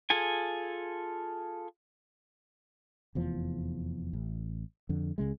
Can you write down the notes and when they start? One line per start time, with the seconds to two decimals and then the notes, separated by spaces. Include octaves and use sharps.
0.10 F4 G#4 A4 G#5
3.15 F1 E2 F3
4.13 A1
4.89 F2 D3
5.18 C#2 C#3 G#3